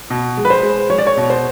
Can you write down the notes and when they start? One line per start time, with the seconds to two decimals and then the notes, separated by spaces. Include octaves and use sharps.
0.10 B2
0.37 G#3
0.45 B4
0.50 C5
0.63 G#3
0.90 G#3 C#5
0.98 D5
1.07 C#5
1.17 B2
1.30 C5